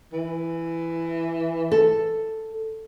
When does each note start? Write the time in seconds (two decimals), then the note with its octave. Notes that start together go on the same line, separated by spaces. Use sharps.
0.13 E3
1.72 A4